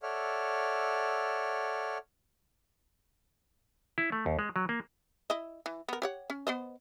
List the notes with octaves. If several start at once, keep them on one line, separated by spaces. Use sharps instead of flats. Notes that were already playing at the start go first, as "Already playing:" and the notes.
A4 C#5 D5 E5 F#5 F6
E4
A3
D#2
G#3
F#3
A#3
E4 D#5
E3
B3 A#4
G4 C#5 F#5
C#4
B3 C5 D#5